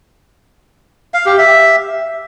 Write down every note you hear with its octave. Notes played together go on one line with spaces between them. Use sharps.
F5
G4
E5